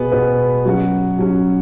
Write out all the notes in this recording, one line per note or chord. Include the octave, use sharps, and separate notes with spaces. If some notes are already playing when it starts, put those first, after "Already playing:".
Already playing: B2 B3 G#4 B4
B2 B3 G#4 B4
F#3 C#4 F#4
F#3 C#4 F#4